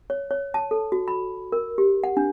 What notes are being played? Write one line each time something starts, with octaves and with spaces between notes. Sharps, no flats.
C#5
C#5
A5
A4
F#4
B5
A#4
G4
F#5
D4